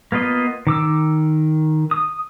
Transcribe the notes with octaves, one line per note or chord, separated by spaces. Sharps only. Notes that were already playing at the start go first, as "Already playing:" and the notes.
A#3 B3 F4 D#5
D#3 D6 E6
D#6